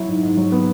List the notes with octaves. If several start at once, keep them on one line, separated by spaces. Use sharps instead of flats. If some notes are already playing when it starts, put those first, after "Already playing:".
Already playing: F#3 E4
G#2
G#2
F#3
B3